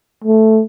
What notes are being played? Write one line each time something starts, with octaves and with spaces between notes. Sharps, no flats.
A3